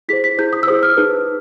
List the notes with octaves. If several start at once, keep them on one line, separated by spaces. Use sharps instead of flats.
E4 G#4 C5 B6
B6
E4 G#4 C5 G6
D#6
E6
E4 G#4 C5 D#6
F6
D#4 G#4 B4